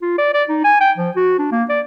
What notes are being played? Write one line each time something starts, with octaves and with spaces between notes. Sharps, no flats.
F4
D5
D5
D#4
G#5
G5
F3
F#4
D4
A#3
D5